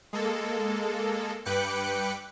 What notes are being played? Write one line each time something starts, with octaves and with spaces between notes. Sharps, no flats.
G#3 A#3 A4
G2 B4 G5 D6 F#6 C#7